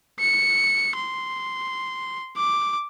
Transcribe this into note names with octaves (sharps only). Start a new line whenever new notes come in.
C#7
C6
D6